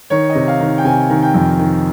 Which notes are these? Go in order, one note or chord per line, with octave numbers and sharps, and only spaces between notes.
D#3 C#5
D#5
C3
F5
D#3
G5
C3 G#5
D#3
G5
F2
D#3